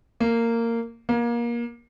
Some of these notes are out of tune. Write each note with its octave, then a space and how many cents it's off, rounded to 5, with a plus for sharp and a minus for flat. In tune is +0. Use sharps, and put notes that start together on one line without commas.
A#3 -15
A#3 +25